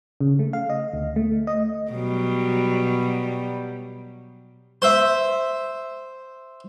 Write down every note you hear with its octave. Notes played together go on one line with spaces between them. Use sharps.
C#3
A3
F5
D#5
D2
A3
D#5
B2 F#3 G3
C5 E5